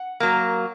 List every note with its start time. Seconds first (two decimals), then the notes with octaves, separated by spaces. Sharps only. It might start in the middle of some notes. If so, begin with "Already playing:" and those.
Already playing: F#5
0.20 F#3 A#3